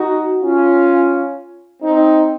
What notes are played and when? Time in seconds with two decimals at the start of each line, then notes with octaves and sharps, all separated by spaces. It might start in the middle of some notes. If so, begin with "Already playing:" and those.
Already playing: D#4 F#4
0.43 C#4 F4
1.81 C4 D#4